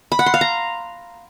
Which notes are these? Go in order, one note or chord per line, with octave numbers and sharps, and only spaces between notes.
B5
F#5
C6
F5
A#5